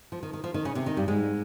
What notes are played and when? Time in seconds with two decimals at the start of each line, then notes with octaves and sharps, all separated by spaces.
0.12 F3
0.23 D#3
0.33 D#3
0.44 F3
0.54 D#3 D#4
0.65 C#3 C#4
0.75 C3 C4
0.86 D#3 D#4
0.97 G2 G3
1.08 G#2 G#3